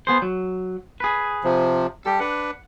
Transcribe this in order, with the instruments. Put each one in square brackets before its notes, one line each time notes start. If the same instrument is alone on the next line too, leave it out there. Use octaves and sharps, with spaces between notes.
[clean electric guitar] B3 G#4 C5
F#3
G#4 B4
[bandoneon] C3 F3
[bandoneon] G3 G4 [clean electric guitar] A4
[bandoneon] D4 B4 [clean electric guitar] F#5